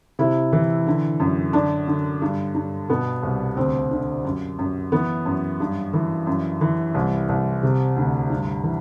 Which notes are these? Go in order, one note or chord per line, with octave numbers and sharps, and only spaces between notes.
C3 E4
E3
D3
F#2
D3 D4
D3
G2
G2
B2 B3
C2
D2 C4
D3
F#2
F#2
E3 B3
F#2
G2
E3
F#2
E3
C2
C2
C3
D2
G2
E3